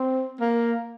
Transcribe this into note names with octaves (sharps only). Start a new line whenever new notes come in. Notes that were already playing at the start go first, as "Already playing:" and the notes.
Already playing: C4
A#3